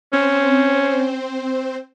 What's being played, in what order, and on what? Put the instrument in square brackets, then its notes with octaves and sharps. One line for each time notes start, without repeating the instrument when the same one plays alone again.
[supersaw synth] C4 C5 [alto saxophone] C#4